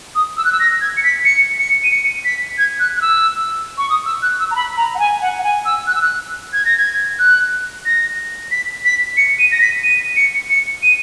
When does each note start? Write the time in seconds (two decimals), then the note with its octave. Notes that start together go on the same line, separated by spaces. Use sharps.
0.15 D#6
0.37 E6
0.45 F#6
0.52 E6
0.60 A#6
0.81 G#6
0.97 C#7
1.03 B6
1.25 C#7
1.59 C#7
1.84 D#7
1.91 C#7
2.25 B6
2.58 G#6
2.80 F#6
2.97 F#6
3.01 E6
3.78 C#6
3.90 D#6
4.06 E6
4.22 F#6
4.39 E6
4.51 A#5
4.56 B5
4.77 A#5
4.95 F#5
4.99 G#5
5.18 G#5
5.21 F#5
5.39 F#5
5.44 G#5
5.65 E6
5.87 F#6
5.95 E6
6.02 F#6
6.53 G#6
6.65 A#6
6.77 G#6
7.19 F#6
7.86 A#6
8.51 B6
8.85 B6
9.17 C#7
9.39 D#7
9.51 A#6
9.61 B6
9.83 D#7
10.16 C#7
10.50 C#7
10.83 D#7